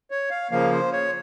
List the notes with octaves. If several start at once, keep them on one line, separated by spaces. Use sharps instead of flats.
C#5
F5
C#3 F3 A#3 F5
C5
C#5